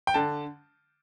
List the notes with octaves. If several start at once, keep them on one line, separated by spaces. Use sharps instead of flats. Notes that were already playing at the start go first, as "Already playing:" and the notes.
G5
D3 A5